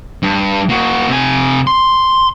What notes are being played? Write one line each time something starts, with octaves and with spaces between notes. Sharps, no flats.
G2
A#3 F#4
C3 G#5
C6